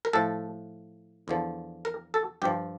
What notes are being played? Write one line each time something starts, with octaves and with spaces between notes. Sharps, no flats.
A#4
A2 F3 A4
E2 D3 F3
A#4
A4
G2 F3 G4